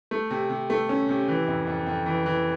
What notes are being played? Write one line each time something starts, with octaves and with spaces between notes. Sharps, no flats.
A3
C3
C3
A3
C#4
C3
E3
F2
F2
F2
E3
E3